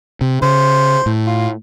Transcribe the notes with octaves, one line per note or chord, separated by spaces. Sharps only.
C3
C#3 C5
A2
F4